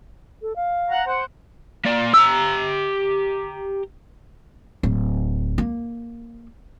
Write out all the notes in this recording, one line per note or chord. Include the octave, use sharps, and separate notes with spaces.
A4
F5
F#5 A#5
C5 F#5
A#3 D5
G4 A#5 E6
D1
A#3